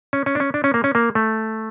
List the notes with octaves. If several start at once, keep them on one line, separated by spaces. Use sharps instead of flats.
C#4
C#4
D4
C#4
D4
C#4
A#3
C#4
A#3
A3